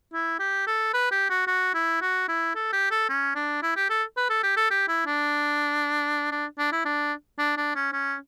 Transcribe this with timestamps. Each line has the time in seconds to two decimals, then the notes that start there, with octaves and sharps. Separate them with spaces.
0.13 E4
0.39 G4
0.67 A4
0.94 B4
1.11 G4
1.30 F#4
1.47 F#4
1.74 E4
2.01 F#4
2.28 E4
2.55 A4
2.73 G4
2.91 A4
3.09 C#4
3.35 D4
3.63 E4
3.76 G4
3.89 A4
4.17 B4
4.30 A4
4.43 G4
4.57 A4
4.71 G4
4.88 E4
5.06 D4
6.32 D4
6.58 D4
6.72 E4
6.85 D4
7.39 D4
7.57 D4
7.76 C#4
7.93 C#4